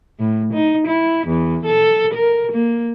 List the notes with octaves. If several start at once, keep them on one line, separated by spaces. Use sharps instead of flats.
A2
D#4
E4
E2
A4
A#4
A#3